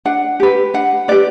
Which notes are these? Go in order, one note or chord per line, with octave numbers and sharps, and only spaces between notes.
D4 F#5
G4 B4
D4 F#5
G4 B4 D5